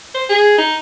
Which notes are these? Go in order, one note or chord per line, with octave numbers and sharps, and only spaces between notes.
C5
G#4
D#4